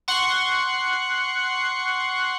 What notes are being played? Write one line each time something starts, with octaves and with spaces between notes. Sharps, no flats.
F#5 C6 C#6